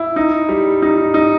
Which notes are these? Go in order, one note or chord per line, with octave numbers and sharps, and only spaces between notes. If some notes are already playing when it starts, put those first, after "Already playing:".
Already playing: E4
D#4
G3
D#4
D#4